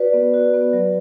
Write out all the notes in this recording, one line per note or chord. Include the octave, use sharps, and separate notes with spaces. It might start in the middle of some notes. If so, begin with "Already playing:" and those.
Already playing: F#4 B4 D5
B3
F#4
B3
F#3